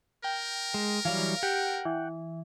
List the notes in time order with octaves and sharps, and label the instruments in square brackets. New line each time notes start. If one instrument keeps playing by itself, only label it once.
[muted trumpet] A#4 [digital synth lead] G5
[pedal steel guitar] G#3
[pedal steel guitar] E3 F#3 G3 [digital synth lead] F5
[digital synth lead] G4 [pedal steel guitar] F#5 G5
[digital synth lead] E3